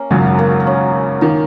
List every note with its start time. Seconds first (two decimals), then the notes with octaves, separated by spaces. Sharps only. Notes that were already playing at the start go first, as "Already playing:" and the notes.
Already playing: A#3 C#4
0.11 G#1 F#2 C#3 F#3
0.39 A#3
0.60 A#3
0.67 C#4
1.21 D#3 A#3